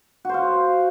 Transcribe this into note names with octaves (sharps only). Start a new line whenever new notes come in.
F#4 C5 F5